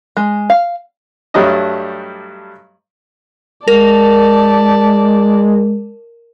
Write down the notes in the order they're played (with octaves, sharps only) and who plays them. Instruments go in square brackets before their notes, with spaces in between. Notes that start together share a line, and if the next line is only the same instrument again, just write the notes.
[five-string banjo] G#3
F5
[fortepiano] G2 F#3 G3 A3 D4 D#5
[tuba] G#3 [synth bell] A#4 [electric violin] D5 A5